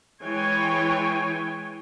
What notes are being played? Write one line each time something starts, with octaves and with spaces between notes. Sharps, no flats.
E3 G#3 C#5 G5 G#5